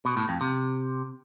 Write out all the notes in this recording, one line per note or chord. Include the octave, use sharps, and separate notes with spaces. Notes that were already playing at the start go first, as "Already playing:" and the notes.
B2
A2
F2
C3